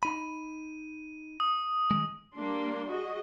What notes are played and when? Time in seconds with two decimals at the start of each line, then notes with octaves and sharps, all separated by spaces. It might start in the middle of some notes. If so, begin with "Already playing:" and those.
0.03 D#4 B5 D#7
1.40 D#6
1.91 D#3 G#3
2.37 G3 A#3 D4 C6
2.89 F#4 G#4 D#5